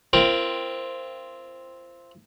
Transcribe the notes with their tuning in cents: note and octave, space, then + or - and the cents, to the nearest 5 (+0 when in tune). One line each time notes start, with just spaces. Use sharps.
C4 +0 F4 -35 A#4 +0